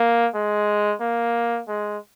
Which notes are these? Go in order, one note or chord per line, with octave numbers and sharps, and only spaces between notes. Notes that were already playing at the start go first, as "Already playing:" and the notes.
Already playing: A#3
G#3
A#3
G#3